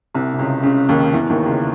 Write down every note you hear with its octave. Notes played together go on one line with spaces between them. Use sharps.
C2 C3
C3
C#2 C#3
C#2 C#3
D#2 D#3
E2 E3
D#2 D#3
C#2 C#3